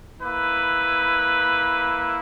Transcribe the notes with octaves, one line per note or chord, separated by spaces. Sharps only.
A#3 E4 B4